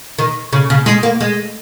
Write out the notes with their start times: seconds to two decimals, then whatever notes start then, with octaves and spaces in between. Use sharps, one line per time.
0.18 D#3
0.53 C#3
0.70 C#3
0.86 G#3
1.03 A#3
1.21 G#3